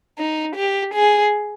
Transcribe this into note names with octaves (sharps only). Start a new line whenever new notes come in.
D#4
G4
G#4